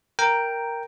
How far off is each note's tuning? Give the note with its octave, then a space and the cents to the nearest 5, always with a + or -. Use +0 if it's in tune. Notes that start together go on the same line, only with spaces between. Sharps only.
A#4 +0 G5 +0 A#5 -5